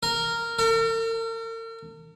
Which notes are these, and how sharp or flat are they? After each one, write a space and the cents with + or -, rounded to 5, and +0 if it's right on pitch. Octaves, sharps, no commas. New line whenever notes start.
A#4 -10
A#4 -45